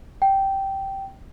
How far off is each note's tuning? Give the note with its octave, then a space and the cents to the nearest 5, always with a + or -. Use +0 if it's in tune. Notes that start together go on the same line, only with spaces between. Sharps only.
G5 -10